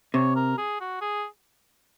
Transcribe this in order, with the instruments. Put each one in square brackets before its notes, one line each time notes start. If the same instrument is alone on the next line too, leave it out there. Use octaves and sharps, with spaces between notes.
[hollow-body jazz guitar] C3 [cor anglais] C#5
[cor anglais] A#4
G#4
F#4
G#4